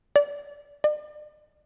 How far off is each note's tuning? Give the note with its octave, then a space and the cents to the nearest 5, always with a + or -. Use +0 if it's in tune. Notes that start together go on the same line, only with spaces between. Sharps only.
D5 -20
D5 +45